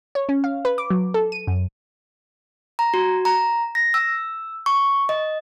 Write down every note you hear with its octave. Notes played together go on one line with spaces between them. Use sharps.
C#5
C#4
F5
B4
D6
F#3
A4
D#7
F#2
A#5
F#4
A#5
A#6
E6
C#6
D#5